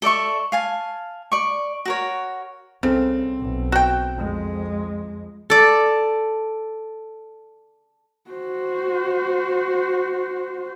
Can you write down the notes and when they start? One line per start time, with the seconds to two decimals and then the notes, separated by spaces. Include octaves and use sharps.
0.02 A4 D5 E5 C#6
0.52 F5 G#5 A5
1.32 D5 C#6
1.85 F#4 A#4 C#5
2.83 C2 C#3 C4 A4
3.40 B1
3.72 F#4 G5
4.16 F2 G#3
5.50 A4 D5
8.30 F#4 C5